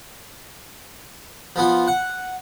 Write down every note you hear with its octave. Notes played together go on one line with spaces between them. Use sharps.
F3 B3 F4
F#5